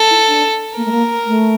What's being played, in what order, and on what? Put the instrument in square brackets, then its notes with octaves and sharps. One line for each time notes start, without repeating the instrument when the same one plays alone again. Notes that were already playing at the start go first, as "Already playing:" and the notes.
Already playing: [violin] A4
[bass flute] E4
D4
[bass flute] A#3 [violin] A#4
[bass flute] A3
A#3
A3